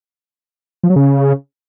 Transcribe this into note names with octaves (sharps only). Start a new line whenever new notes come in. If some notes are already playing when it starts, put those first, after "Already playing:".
F3
F#3
C#3